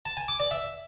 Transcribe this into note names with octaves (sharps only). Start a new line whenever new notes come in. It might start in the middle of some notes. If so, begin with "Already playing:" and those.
A5
G#5
D6
D5
E5